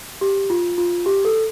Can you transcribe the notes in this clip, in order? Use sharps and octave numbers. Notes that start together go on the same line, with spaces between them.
G4
F4
F4
G4
A4